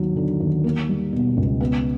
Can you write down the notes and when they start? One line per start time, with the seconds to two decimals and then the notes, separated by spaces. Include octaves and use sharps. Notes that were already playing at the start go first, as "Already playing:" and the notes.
Already playing: D#2 F#3
0.16 D3
0.40 D#2
0.64 A#3
0.89 G3
1.13 B2
1.37 C#2
1.61 B3